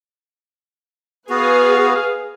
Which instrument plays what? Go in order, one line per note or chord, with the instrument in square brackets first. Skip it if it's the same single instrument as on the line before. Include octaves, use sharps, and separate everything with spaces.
[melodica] B3 F#4 [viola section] G#4 B4 F5